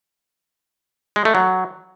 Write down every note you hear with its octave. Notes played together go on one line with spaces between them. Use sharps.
G#3
A3
F#3